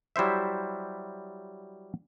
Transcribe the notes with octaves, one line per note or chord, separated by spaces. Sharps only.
F#3 G3 E4 C5 E5